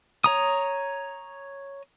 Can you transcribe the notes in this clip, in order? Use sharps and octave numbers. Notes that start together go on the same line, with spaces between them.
C#5 A#5 D#6